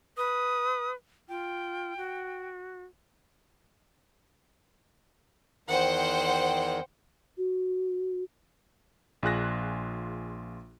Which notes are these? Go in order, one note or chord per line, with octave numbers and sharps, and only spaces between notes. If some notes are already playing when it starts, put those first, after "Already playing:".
B4 D#6
F4 G5
F#4
E2 D#3 C5 F#5 G5
F#4
A#1 F4 G#4 F#6 A#6